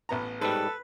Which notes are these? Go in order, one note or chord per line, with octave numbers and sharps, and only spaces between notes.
A1 B3 A#5
G#2 G3 A4 B4